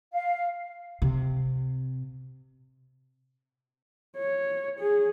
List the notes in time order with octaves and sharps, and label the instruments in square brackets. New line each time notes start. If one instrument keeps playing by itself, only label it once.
[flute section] F5
[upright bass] C3
[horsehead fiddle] C#5
G#4